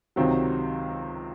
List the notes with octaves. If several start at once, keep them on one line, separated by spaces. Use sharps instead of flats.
C#2 C3 D#3 F#3 C4